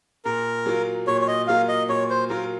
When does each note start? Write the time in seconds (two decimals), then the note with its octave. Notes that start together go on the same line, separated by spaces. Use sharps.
0.25 A#2 A#4
0.66 F#3 A#3 F4
1.07 A#2 C#5
1.21 C#5
1.28 D#5
1.47 F#3 A#3 F4 F5
1.69 D#5
1.89 A#2 C#5
2.10 C5
2.30 F#3 A#3 F4 A#4